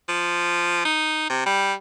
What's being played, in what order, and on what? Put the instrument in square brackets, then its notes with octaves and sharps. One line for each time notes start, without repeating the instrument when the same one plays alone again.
[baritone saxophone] F3
D#4
C3
G3